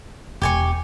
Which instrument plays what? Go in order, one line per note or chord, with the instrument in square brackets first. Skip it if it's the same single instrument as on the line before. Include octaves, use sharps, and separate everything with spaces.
[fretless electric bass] E1 [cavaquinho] G4 G#5 C#6